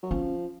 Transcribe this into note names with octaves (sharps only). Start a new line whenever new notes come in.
F#3
F3 C#4